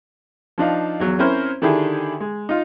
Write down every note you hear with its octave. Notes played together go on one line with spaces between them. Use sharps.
F3 D4 D#4 F5
E2 F#3
C4 C#4 E4 A#4 C5
D3 D#3 D4 E4 G4 G#4
G#3
D#4 F4